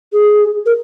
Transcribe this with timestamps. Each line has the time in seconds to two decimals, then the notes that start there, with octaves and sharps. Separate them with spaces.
0.13 G#4
0.66 A#4